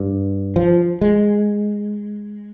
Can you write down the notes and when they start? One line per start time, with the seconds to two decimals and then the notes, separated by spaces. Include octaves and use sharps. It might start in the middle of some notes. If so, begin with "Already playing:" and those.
Already playing: G2
0.56 F3
1.01 G#3